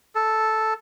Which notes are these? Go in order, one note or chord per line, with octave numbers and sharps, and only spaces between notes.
A4